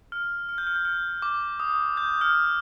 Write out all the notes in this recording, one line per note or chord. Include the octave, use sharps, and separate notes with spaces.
F6
F6
G6
F6
G6
F6
D6
D#6
G6
F6